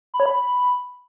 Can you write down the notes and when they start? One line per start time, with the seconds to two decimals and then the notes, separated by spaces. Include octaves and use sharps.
0.14 B5
0.20 C#5
0.26 B5